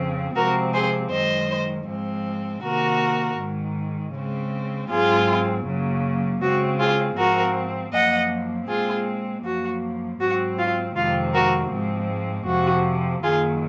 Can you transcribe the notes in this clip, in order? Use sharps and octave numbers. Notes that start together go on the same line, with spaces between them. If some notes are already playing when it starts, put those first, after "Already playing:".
Already playing: F2 C#3 F3 C4
C3 F3 G#3 C4 F#4 A#4
G#4 C5
F#2 D#3 G#3 C5 D#5
G#2 F3 G#3 C4
C3 D#3 A#3 F#4 A#4
G#2 D#3 G#3
C#3 G#3 C4
G#2 F#3 C4 F4 G#4
F#2 C#3 F#3 A#3
C#3 G#3 C4 F#4
F4 G#4
G#2 F3 C4 F#4 A#4
F#2 F3 A#3 D#5 F#5
A#2 G#3 C4 F4 G#4
F#2 F3 A#3 F#4
G#2 F#3 C4 F#4
F4
F2 C3 D#3 G#3 C4 F4
F#4 A#4
G#2 F3 G#3 C4
F2 C3 F3 F#4
F#2 D#3 F#3 A#3 F4 G#4